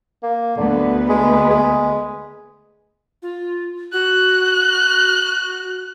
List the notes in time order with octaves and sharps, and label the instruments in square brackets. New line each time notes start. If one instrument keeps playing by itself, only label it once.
[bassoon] A#3
[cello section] D2 B3 B4 [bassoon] D3
[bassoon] G#3
G#3
[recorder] F4
[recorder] F#4 [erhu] F#6